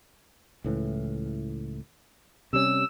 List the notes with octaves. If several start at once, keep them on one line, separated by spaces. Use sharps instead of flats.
C#2 A2 E3
C3 G3 C#4 E6